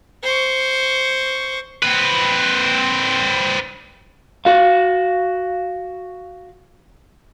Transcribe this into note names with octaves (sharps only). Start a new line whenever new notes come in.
C5 C#6
C4 B4
F#4 F5